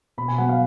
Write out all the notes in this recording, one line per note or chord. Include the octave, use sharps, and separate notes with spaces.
B2 B5
G#5
F#3 B3 F#5
F5